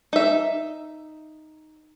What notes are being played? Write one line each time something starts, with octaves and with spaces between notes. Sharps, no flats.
D#4 E5